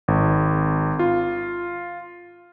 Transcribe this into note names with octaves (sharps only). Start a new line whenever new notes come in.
G#1
F4